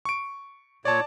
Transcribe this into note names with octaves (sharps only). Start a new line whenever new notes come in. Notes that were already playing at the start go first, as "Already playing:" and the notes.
C#6 D7
A#2 C#5 D5 A5